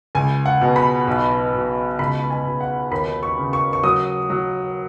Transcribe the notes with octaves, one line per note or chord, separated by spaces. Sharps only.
C#2 G#5
F#5
B2
B5
B1
B2
C#2 B5
G#5
B2
F#5
D#2 B5
C#6
C#3
C#6
C#6
F#3 D#6
F#3